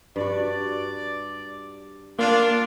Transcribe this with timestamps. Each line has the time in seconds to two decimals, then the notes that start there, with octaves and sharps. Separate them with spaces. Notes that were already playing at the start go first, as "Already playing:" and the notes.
0.16 G2 F#4 D5
2.19 A#3 D4 F4